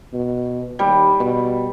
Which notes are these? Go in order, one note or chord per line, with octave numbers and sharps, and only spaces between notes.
B2
D#2 G3
B2